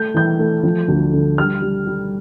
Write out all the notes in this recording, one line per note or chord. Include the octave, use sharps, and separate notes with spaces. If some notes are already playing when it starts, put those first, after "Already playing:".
Already playing: A3 G6
E3 G6
A3
F3
D2
D3
G3 F6
G3
G3